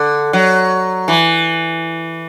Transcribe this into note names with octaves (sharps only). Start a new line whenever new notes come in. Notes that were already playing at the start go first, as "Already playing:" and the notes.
Already playing: D3
F#3
E3